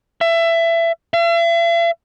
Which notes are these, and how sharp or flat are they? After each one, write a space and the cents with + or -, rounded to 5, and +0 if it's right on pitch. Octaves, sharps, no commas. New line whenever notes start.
E5 +20
E5 +45